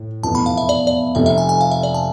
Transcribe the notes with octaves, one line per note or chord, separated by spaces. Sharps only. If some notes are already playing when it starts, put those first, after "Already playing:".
Already playing: A2
F1 E2 B2 B3 A5
B5
F5
E5
D5
D5
F1 F2 C3 E5
E5
G#5
G#5
F5
E5
D5
A5